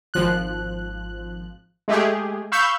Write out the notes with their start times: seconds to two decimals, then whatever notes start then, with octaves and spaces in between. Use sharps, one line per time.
0.14 G#1 F3 F#6
1.88 G#3 A3 G4 G#4
2.52 F5 B5 C#6 E6 G6